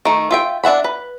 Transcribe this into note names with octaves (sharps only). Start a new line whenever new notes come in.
D#3 A3
F4 E5 G5
D4 E5 F#5 B5
B4